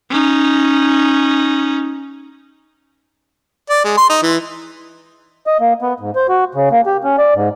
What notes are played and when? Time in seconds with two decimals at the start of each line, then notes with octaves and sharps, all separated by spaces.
0.10 C#4 D#4
3.70 D5
3.85 G#3
3.98 C6
4.10 D#4
4.23 E3
5.47 D#5
5.60 A#3
5.82 B3
6.00 G#2
6.16 C5
6.28 F#4
6.55 C#3
6.71 A#3
6.86 G4
7.04 C#4
7.18 D5
7.35 G#2